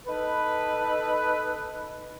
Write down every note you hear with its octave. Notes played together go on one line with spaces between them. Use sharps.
D#4 A4 B4